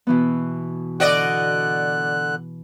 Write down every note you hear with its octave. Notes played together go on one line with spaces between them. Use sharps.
B2 E3 B3
D3 F#4 D5 D#5 F#6